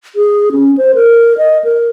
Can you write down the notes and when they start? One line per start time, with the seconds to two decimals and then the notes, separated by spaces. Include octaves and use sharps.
0.16 G#4
0.52 C#4
0.78 C5
0.95 A#4
1.38 D#5
1.64 A#4